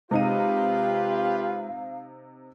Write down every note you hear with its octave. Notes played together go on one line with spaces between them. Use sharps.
C3 G#3 D#4 F4 G4 B4 F5 D#7